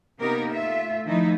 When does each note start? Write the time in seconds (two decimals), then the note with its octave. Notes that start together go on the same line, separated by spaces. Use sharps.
0.20 C3 A#3 B3 D#4 G4 A#4
0.53 A3 F4 E5
1.05 D#3 F3 A3 D#4 E4